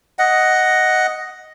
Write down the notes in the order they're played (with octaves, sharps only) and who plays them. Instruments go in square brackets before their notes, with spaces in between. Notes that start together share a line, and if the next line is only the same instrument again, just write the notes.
[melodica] D#5 F#5